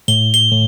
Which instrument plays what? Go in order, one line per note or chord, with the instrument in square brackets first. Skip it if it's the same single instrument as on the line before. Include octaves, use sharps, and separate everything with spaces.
[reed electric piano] A2 [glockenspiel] G7
[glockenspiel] G7
[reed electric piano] A2